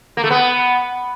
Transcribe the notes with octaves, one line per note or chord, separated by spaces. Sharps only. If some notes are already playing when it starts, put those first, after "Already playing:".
A#3
A3
B3